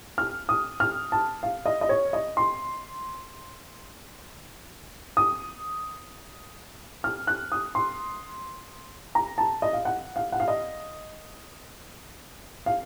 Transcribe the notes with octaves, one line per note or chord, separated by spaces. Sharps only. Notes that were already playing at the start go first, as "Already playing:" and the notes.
F6
D#6
F6
A5
F5
D#5
D#5
C#5
D#5
C6
D#6
F6
F#6
D#6
C6
A#5
A5
D#5
F5
F#5
F5
F#5
F5
D#5
F5